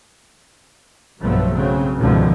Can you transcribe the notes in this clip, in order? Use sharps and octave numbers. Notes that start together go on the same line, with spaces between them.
B1 G2 F3 F#3 A3 B3
C#3 F#3 C4
C#2 G#2 B2 D3 D#3 F3